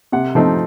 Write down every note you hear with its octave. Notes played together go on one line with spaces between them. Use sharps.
C3 F#5
F3 A3 C4 D#4